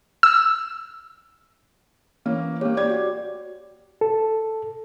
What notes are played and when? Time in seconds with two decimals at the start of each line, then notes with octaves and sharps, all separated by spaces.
0.23 E6
2.25 E3 A#3 C#4
2.61 A#3 G4 C#5
2.77 G4 D5 G#6
2.90 F#4
4.01 A4